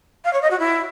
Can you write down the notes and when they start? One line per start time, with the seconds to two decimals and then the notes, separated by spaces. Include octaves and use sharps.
0.25 F5
0.33 C#5
0.42 D#5
0.51 F#4
0.59 E4